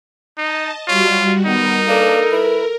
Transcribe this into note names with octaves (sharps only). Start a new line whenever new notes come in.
D#4 D#5 A5
G3 F4 F#4 C#5
D#3 B3 D#4 A#4
A#3 D4 A4 B4
E4 B4